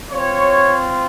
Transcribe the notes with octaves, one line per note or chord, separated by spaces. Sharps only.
C4 F4 C#5